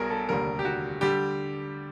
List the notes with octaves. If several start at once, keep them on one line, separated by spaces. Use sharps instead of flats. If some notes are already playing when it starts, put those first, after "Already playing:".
Already playing: B1 B2 G3 G#4 A#4
A4
F1 D#2 D3 G3 A#4
G4
F#4
D3 G3 G4